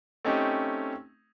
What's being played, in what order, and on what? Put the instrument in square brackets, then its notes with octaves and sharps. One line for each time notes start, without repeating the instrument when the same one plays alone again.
[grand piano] A3 C4 C#4 D#4 G4